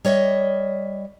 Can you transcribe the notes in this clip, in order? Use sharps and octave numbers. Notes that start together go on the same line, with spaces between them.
G3 C#5 D#5 E5